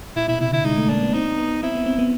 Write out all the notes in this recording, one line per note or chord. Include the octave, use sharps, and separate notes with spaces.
A#2 E4
B2 E4
C3 E4
D3 E4
G#3 D#4
A3
A#3 D4
B3
C4 D#4
B3
C4 E4
B3
C4
B3